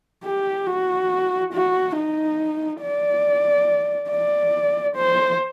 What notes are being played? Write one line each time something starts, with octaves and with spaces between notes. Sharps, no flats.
G4
F#4
F#4
D#4
D5
D5
C5